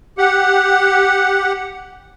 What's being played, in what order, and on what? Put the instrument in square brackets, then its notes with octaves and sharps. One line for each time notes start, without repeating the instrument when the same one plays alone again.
[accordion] G4 F#5